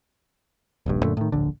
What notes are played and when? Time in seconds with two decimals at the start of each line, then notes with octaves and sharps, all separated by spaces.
0.86 D#1 A#1 G2
1.03 F#2 A#2 D3 A3
1.17 A2 D#3
1.32 D1 A#1 D3